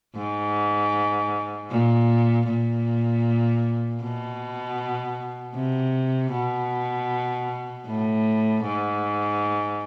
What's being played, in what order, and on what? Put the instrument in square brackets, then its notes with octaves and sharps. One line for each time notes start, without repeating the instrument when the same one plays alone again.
[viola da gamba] G#2
A#2
A#2
B2
C3
B2
A2
G#2